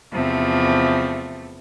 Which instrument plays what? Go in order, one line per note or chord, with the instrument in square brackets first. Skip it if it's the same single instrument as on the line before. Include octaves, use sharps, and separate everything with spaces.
[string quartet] E2 C3 F3 A3